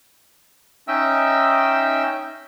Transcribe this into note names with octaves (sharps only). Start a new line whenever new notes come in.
C#4 D#4 D#5 E5 G5 E6